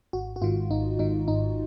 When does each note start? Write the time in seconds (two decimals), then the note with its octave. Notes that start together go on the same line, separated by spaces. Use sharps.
0.13 G#1 F#4
0.36 F#4
0.41 G#2 D#3 F4
0.70 G#1 D#4
0.99 G#2 D#3 D#4
1.28 G#1 D#4